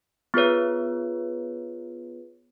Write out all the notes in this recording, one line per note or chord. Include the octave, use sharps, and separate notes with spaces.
B3 F4 G#4 B4 C#5